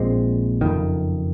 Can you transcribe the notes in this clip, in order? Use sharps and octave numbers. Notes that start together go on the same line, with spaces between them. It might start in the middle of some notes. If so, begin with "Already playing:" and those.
Already playing: A#1 A#2 G#3 C4
F#1 F2 D#3